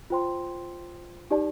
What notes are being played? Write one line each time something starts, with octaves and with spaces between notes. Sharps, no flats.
F4 C5 G5 C6
D#4 G4 D5 A5